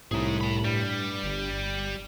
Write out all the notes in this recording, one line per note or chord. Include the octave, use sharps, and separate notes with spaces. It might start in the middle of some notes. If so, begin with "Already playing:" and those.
C2 A2 D#4 G#4
A5 B5
G2 G3
G1